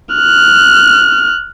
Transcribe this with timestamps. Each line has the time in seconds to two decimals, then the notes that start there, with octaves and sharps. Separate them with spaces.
0.15 F6 F#6